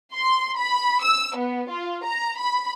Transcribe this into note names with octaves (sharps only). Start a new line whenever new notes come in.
C6
B5
E6
B3
F4
A#5
B5